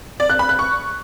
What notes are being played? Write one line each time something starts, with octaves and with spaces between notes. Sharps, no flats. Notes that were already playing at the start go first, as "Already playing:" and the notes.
D5
F#6
B5
F#6
C#6